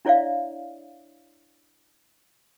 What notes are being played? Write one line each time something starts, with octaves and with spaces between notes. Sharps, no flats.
D4 E4 C#5 D5 E5 F5